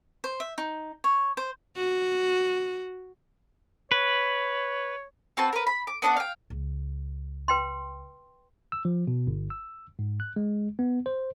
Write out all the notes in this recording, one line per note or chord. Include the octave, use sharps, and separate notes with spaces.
C5
E5
D#4
C#5
C5
F#4
B4 C#5
C4 F#4 B4 A5
A#4 B4
B5
D6
B3 D4 D5 F#5
F5 G5
C#2
B4 G5 C6
E6
F3
B2
G1
E6
G#2
F#6
G#3
B3
C5